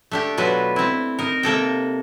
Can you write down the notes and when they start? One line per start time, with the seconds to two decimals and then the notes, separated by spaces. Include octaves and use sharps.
0.11 A3 D4 G4
0.38 B2 F#3 F4 B4
0.76 C4 E4
1.19 D#4 A#4
1.43 C3 A#3 A4 G5